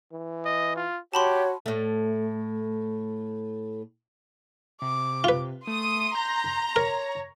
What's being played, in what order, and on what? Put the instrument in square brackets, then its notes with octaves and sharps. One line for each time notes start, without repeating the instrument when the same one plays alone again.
[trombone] E3
[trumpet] D#5
F4
[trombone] F#4 [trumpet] G4 [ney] C#5 [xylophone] A5 B5 C6
[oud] A2 A3
[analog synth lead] C3 [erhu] D6
[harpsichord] F4 B4
[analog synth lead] A3 [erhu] C6 [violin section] D#6
[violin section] A#5 [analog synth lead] G6
[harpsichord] A#4 [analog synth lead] C#5